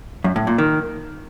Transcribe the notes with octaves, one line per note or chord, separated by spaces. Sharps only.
F#2
A2
A#2
D#3